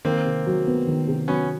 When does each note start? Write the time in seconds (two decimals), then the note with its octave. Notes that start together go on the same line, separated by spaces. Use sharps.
0.05 D#3 A#3 C4
0.25 C3
0.46 F#3
0.67 B3
0.87 D#3
1.07 C3
1.28 F#3 B3 C#4